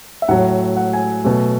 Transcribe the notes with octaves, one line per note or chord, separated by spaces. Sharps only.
E5
A2 F#3 A3 F#5
F#5
G#5
B2 F#3 A3 G#5